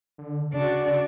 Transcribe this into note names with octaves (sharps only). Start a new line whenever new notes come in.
D3
C#3 D4 F#4 D5